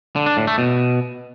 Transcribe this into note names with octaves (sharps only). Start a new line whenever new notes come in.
D3
D4
A2
A3
B2